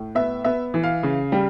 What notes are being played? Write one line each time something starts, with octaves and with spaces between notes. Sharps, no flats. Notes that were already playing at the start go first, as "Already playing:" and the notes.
Already playing: A2
B3 E5
B3 E5
E3
F5
C#3
G3